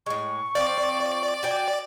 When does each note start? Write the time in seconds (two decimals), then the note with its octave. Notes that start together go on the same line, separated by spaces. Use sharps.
0.06 A2 G#3 C#6
0.55 F3 C4 D5
1.43 F#4 G5 G#5